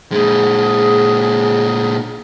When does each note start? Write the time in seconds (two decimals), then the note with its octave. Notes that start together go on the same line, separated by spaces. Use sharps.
0.12 A#2 G#3 G#4